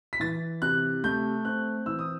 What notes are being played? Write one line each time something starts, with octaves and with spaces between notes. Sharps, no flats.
B6
E3 A6
C3 F#6
A3 G6
C4 F#6
E3 E6
D#6